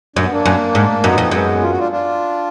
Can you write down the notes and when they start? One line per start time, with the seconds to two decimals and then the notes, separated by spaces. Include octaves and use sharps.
0.16 F#2 D4
0.24 B3
0.32 A#3 D4
0.46 F#2
0.75 G#2
1.03 F#2 B3 D#4
1.18 F2
1.31 F#2 G#3 B3
1.62 F4
1.71 F#4
1.79 D4 F4
1.92 D4 F4